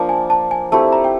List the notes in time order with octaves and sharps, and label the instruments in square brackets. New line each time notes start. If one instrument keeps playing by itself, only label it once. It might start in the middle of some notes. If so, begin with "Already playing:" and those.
Already playing: [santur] F3 A#3 D4
[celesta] G#5
A5
G#5
[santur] A3 C4 E4 G4 [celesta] A5
[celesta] A#5
G5